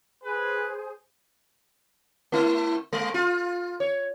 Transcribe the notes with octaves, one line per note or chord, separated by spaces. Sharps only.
G#4 B4 C5 G#5
A3 E4
G#3
F4
C#5